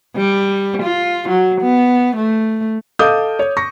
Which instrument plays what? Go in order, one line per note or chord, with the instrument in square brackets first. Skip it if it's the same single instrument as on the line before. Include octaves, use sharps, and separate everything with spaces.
[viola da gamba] G3
F4
F#3
B3
A3
[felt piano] A4 D#5 F5 D6 D#6 G6
C#5
C#6 A#6